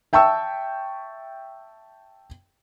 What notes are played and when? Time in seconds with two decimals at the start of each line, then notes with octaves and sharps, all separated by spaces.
0.13 E5 G5 A5 C#6 E6